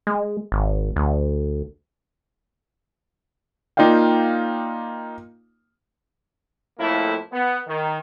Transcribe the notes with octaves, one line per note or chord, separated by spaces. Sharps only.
G#3
G#1
D2
A#3 D#4 F4 D5 F5 G5
F2 A2 A3 A#3 E4
B3
D#3